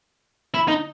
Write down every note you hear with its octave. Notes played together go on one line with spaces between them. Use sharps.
E4
D#4